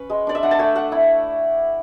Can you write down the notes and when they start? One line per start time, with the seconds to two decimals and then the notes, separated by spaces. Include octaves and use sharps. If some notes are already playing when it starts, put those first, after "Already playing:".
Already playing: C#4 B4
0.10 G#3
0.27 D4 D5
0.35 E5
0.43 D4 F#5
0.51 A5
0.59 A3 G#5
0.75 A3 F#5
0.92 E4